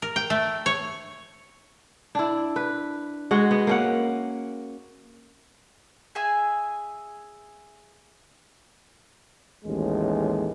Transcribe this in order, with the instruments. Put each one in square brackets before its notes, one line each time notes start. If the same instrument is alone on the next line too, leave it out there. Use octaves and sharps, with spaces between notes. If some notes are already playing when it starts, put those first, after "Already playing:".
[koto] A#4
G5
A3
C#5
[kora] D4 E4
B4
G#3 F#4 D#5 F#5
B3
A#3 C#4 F#5
[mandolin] G#4 E5 G#5
[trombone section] A1 D#2 G#3